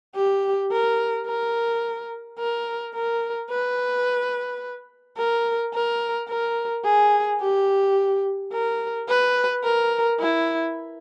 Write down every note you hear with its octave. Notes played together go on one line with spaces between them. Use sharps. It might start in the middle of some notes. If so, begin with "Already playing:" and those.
G4
A#4
A#4
A#4
A#4
B4
A#4
A#4
A#4
G#4
G4
A#4
B4
A#4
E4